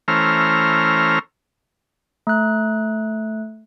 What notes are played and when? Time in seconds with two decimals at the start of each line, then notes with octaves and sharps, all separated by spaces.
0.08 E3 A3 C#4 C5 A#5 F6
2.27 A3 F#6